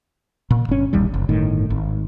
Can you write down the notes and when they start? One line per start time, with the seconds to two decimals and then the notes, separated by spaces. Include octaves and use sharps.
0.50 A#2
0.69 G1 C#4
0.93 E1 A#1 D#2 G3
1.14 F#1
1.29 G1 A2 D#3
1.70 G#1